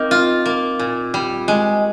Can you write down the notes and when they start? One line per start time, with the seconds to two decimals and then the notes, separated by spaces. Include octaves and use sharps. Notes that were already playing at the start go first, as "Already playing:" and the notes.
Already playing: A#3 C4 D#4
0.11 F4
0.46 A#3
0.79 A#2
1.14 G3
1.48 G#3